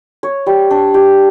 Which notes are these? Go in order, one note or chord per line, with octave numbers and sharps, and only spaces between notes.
C#5
G3
D4
G4